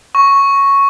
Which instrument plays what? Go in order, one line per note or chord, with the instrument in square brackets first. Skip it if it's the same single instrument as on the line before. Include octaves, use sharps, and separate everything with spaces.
[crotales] C#6